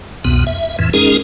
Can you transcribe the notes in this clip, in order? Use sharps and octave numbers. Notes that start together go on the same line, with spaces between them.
C2 F2 B2 B3
E5
F2 A2 E3
G#3 C#4 D#4 G#4 A#4